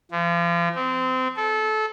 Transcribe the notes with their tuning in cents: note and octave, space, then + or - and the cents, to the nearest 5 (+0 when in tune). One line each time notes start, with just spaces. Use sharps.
F3 -35
C4 -25
A4 -25